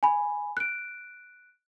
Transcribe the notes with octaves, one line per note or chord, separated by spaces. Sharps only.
G#5 B5
F#6 D7